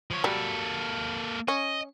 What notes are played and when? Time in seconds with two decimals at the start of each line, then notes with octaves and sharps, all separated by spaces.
0.11 F3 C#5
0.24 F#3 G3 A#3 A4
1.48 C#4 D#5